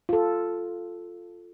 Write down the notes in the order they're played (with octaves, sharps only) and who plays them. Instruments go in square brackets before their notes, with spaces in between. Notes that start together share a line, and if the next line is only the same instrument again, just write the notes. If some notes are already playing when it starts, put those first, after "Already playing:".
[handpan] F4 A4